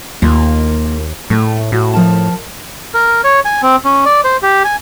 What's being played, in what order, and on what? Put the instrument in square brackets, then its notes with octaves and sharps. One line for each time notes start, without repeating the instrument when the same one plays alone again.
[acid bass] D#2 [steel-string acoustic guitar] A#3 F4
[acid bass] A2 [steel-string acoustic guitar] A3
[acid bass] A2 [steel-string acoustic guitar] F#4
[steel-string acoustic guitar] F3 A#4 A5
[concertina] A#4
C#5
G#5
C4
C#4
D5
C5
G4
G#5